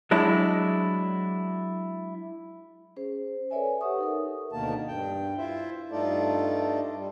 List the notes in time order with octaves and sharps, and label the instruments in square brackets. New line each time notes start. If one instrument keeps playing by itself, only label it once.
[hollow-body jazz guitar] F#3 G#3 D4 E4
[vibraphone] C#4 G#4 C5
A4 B4 C#5 D5 E5 G#5
G4 B4 E5 F#5 C#6 D#6
D#4 A4 A#4
[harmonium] D2 B2 D#3 A#3 A5
G2 G5
E4 F4 C5 E5
G2 A3 D#4 F4 A4 D5
G3